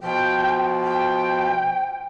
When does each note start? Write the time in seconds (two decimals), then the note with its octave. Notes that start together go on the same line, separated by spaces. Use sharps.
0.01 B2 F3 G5
0.83 G5